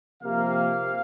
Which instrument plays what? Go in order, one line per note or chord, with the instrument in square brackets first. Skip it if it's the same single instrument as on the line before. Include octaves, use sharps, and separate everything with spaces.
[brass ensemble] C3 F3 A#3 G4 [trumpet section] F5